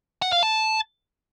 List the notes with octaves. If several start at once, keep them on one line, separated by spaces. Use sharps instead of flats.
F#5
F5
A5